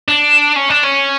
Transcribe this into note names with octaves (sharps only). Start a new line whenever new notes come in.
D4
C#4
D4
C#4